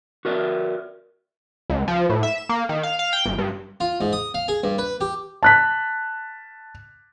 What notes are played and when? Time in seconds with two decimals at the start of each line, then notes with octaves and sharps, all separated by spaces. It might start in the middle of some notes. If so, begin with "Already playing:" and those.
0.25 F#4 A#4 D5 E5
1.70 C#2
1.88 F3
2.09 A2
2.23 E5
2.38 E7
2.49 A#3
2.69 D#3
2.83 F5
2.99 F5
3.13 G5
3.26 G1
3.38 G2
3.80 F4
4.01 G#2
4.13 D#6
4.34 F5
4.48 G#4
4.64 G2
4.78 B4
5.01 G4
5.43 A5 F#6 B6